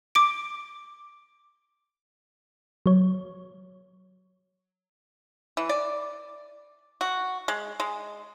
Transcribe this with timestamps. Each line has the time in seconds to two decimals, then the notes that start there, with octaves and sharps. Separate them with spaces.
0.15 D6 D7
2.86 F#3 C#5
5.57 E3
5.69 D5
7.01 F#4
7.48 G#3
7.80 G#3